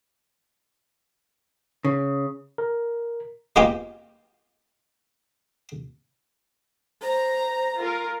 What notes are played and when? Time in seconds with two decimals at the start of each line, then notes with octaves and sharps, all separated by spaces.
1.85 C#3
2.58 A#4
3.56 G#3 A#3 B3 F4 G4
7.03 C5 A#5
7.82 F4 A#4